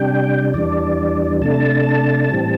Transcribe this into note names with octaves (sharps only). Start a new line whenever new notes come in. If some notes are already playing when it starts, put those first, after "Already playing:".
Already playing: C3 G3 D4 G5
E2 E3 G3 D4 D5
C3 A3 D4 A5
A2 E3 G3 C4